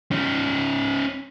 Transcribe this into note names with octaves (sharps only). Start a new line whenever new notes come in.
C#4 D#4